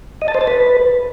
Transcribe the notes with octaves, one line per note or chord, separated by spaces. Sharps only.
D#5
A5
C5
A5
B4